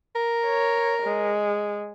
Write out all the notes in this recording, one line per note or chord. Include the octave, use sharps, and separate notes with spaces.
A#4
C#5
G#3